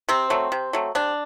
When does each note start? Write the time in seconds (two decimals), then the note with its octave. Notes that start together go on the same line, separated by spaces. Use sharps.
0.09 C3 C4
0.30 F#3 A3
0.52 C3
0.73 F#3 A3
0.95 C3 D4